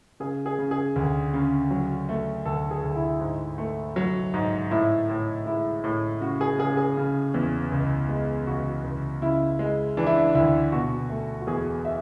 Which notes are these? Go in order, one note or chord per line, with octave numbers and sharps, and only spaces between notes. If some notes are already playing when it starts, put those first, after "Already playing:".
C#3 G#4
G#4
C#3
G#4
D2
C#3
F#3
A3
D2 A4
G#4
D2
E4
G#2
A3
F#3
G#2
A2 E4
A2
G#3 E4
A2
C#3 F#4
G#4
C#3 G#4
G#4
C#3
E2
C#2
G#3
C#2 F#4
C#2
C#3 E4
G#3
E3 D4
E4
D4
D2 E4
B2 F#4
A3
F#4
E2 G#4
E5